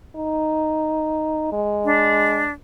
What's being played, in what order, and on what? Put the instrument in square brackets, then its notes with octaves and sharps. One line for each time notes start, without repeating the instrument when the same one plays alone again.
[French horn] D#4
G#3
[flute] D4